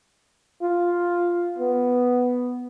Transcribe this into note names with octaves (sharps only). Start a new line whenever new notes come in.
F4
B3